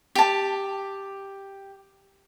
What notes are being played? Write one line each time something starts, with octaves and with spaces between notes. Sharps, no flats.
G4 A5